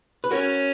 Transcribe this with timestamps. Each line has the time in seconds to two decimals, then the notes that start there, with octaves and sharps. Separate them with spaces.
0.24 B4
0.31 C#4 F#4 A#4